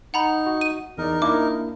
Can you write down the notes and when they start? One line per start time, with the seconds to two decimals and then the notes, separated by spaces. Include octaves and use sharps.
0.14 D#4 F#5 A#5 B5
0.46 F#4
0.61 D#7
0.98 E2 D#4 A#4 D5
1.22 A#3 D4 E4 D6